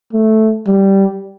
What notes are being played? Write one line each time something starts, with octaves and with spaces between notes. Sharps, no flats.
A3
G3